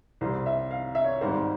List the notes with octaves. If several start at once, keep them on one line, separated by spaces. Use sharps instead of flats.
C2 C3 G3 C5
E5
F5
E5
C#5
G#1 G#2 G3 C5